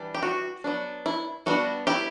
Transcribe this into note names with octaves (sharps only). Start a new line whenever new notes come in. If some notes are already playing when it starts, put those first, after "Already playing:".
Already playing: E3 G3 D4
G4
F#4
F#3 B3 D4
E4
G3 B3 D4 F#4
E4 G4